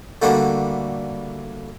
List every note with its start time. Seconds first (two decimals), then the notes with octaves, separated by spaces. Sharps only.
0.22 D3 G3 A3 A#3 F#4